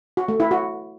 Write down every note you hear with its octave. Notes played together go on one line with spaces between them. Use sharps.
F#4
A3
E4
F#4